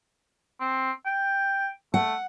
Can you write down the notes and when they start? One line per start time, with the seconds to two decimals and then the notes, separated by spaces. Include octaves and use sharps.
0.60 C4
1.06 G5
1.94 A3 F#5